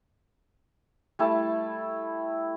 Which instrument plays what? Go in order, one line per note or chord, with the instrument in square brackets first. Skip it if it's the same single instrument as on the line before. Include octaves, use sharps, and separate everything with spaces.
[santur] G3 A3 E4 A5